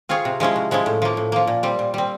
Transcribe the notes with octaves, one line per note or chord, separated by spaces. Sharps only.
C4 F4 G#4 C#5
C3
F3 G#3 C#4 E4
C3
F3 G#3 C#4 E4
A2
F3 A#3
A2
F3 A#3
A#2
G3 C4
A#2
G3 C4